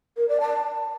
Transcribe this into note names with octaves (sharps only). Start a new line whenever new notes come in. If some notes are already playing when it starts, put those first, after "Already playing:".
A#4
D5
A5